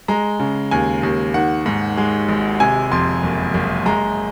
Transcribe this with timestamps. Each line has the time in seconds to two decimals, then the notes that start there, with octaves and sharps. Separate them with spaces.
0.08 G#3 A#5
0.40 C#3
0.71 D#2 G#5
1.03 D#2
1.34 D#3 F#5
1.66 G#2
1.97 G#3
2.29 G#1
2.60 C3 G#5
2.92 F2 C6
3.23 F#1
3.54 F#1
3.86 G#3 A#5